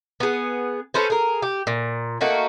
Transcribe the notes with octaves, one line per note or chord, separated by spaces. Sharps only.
B3 G#4
C#4 A4 B4 C5
G#4 A#4
G4
A#2
A3 A#3 D#4 F#4